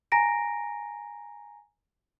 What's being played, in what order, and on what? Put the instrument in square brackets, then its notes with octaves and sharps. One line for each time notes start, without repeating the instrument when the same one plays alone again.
[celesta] G#5 A#5 A#6 D7